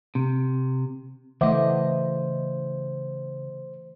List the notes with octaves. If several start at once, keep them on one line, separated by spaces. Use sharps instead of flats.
C3
C#3 E3 A3 C5 D#5 E5 F#5 D6